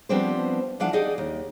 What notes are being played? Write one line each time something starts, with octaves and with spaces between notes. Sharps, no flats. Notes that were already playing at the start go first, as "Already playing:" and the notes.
F3 G3 B3 C4 D4 C5
E3 F3 D4 F5 F#5 A5
D#4 G4 G#4 D5 D#5
D#2